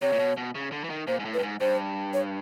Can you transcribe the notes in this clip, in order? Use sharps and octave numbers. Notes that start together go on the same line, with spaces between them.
C3 C#5
A#2
B2
B2
C#3
D3
E3
D#3
A#2 C5
G#2
A2
B4
G2
G#2
G2 C5
C#5